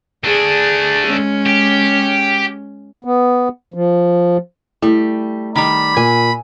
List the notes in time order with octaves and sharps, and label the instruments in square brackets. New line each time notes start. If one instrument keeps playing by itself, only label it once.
[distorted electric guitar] A3 D4 [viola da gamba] G#4
[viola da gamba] G#3 C#4
[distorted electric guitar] G4
[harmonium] B3
F3
[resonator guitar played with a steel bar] G3 [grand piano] A3 [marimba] E4
[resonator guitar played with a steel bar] D#3 G3 [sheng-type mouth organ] B5
[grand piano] A#2 [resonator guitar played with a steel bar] G#5